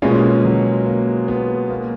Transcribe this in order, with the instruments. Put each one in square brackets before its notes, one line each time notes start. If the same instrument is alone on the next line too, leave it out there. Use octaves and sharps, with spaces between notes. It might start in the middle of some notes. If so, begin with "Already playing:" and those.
[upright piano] B2 G#3 C#4 F4 [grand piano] A#3
[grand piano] F#3
A#3
B3
A#3